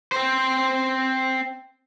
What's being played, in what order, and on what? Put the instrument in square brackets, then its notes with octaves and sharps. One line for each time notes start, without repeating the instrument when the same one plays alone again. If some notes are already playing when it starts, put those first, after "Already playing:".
[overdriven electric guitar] C4 C5